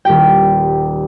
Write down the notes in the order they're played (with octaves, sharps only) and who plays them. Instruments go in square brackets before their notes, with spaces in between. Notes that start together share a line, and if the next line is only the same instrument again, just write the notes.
[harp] D#1 G4 G5